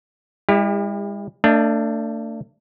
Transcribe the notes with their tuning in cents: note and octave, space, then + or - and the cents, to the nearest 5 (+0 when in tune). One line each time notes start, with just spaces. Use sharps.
G#3 -45 E4 +0 G4 +35
A3 +40 D4 +0 D#5 +0